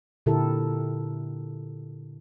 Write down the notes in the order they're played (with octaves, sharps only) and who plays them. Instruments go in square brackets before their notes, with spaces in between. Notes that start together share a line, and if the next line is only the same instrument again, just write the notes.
[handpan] A#2 D3 E4 G4 A4 A#4